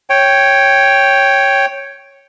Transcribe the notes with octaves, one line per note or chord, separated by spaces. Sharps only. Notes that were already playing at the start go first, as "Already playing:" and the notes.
C#5 G5